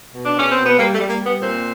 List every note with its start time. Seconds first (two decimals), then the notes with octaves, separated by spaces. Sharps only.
0.14 B2
0.25 D4
0.35 B2 C#4
0.51 C4
0.56 B2
0.65 B3
0.78 G3 A#3
0.94 A3
0.99 G3
1.09 A#3
1.20 G3
1.26 B3
1.41 A#2 C4